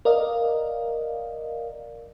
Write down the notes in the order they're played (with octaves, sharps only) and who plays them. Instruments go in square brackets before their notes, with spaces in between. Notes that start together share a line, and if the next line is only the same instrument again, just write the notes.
[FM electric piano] A#4 D5 D#5 F5